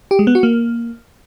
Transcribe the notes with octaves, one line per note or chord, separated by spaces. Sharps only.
G4
G#3
B3
F#4
A#3